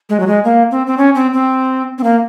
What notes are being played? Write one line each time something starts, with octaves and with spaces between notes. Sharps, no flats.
G#3
F#3
G#3
A#3
C4
C4
C#4
C4
C4
C4
A#3